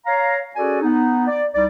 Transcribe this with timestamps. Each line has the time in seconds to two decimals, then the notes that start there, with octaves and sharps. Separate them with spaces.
0.06 C#5 F5 A#5
0.56 C#4 F#4 G#4 A4 D5 G#5
0.82 B3 D#4
1.28 D5
1.55 C2 G3 D#4 D5